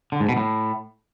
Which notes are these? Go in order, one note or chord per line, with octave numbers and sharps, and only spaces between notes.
D3
G#2
B2
A2